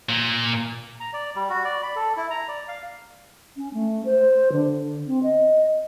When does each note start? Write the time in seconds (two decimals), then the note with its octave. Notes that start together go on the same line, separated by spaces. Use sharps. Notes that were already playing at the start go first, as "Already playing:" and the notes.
0.09 A#2
1.00 A#5
1.13 D5
1.35 G3
1.50 F#4
1.65 D5
1.82 B5
1.96 A4
2.17 E4
2.31 A#5
2.48 D5
2.68 F5
3.57 C#4
3.73 A3
4.05 C5
4.52 D3
5.07 C4
5.23 D#5